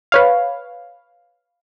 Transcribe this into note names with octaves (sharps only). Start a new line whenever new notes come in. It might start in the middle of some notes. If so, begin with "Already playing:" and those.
B4 C#5 F5